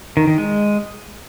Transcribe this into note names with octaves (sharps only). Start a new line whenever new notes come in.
D#3
D#3
G#3